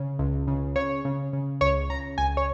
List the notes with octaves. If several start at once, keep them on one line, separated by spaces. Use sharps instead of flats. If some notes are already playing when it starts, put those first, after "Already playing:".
Already playing: C#3
C#2
C#3
C#3 C#5
C#3
C#3
C#2 C#5
C#3 A#5
C#2 G#5
C#5